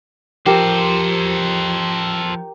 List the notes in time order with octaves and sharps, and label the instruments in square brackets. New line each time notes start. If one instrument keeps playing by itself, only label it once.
[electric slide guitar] F3 [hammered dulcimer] G4 A#4 [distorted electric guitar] A4 C5